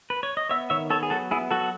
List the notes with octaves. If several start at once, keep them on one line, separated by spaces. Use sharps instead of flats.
B4
C#5
D#5
B3 C#5 E5
D#3 C#5 E5
B3 A4 C#5
G#4
F#3 F#4 A4
B3 E4 G#4
F#3 F#4 A4